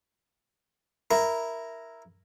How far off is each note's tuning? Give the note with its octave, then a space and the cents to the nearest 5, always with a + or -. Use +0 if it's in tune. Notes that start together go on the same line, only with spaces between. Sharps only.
E4 +0 A#4 +0